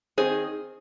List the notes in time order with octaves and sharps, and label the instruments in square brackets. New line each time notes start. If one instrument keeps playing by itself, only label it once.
[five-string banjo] D#3 C4 D#4 G#4 C5